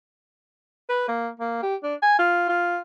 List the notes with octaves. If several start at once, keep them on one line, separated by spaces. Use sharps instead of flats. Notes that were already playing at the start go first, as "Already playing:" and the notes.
B4
A#3
A#3
G4
D4
G#5
F4
F4